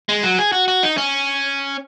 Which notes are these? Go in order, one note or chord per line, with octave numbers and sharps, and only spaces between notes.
G#3
F#3
G#4
F#4
F#4
D#4
C#4